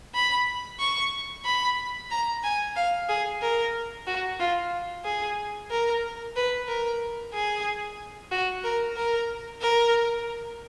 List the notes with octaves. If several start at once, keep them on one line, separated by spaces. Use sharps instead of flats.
B5
C#6
B5
A#5
G#5
F5
G#4
A#4
F#4
F4
G#4
A#4
B4
A#4
G#4
F#4
A#4
A#4
A#4